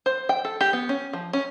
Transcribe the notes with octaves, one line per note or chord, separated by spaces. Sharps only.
C5
G5
A4
G4
B3
C#4
F3
C#4